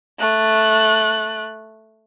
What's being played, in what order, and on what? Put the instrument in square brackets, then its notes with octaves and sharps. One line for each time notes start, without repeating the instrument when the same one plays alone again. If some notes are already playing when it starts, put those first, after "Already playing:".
[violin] A3 F#6